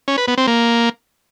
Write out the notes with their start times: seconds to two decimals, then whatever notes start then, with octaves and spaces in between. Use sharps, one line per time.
0.08 C#4
0.18 B4
0.28 B3
0.38 C4
0.47 A#3